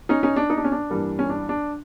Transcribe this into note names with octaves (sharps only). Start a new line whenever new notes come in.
C#4 D#4
C#4 D#4
D4
D#4
D4
C#4
D4
G2 E3 G3 A#3
C#4
D4
D4